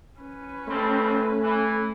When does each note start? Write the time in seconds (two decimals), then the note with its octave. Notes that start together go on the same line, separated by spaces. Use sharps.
0.20 C#4 B4
0.68 F2 G3 A3 C4
1.42 E3